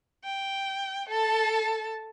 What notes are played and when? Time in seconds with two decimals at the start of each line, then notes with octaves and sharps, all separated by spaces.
0.24 G5
1.09 A4 A5